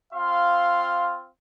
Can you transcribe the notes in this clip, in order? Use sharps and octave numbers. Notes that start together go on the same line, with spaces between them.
C4 F4 F5 C6